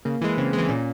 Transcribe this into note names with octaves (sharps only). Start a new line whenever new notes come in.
C#3 A#3
E3 G#3
C#3 C4
E3 G#3
A#2 C#4